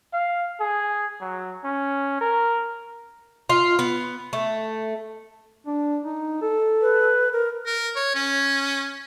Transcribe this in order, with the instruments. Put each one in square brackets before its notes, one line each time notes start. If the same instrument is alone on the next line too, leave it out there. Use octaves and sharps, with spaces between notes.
[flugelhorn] F5
G#4
F#3
C#4
A#4
[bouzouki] F4
B3
A3
[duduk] D4
D#4
A4
[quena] B4
A#4
[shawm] A#4
C#5
C#4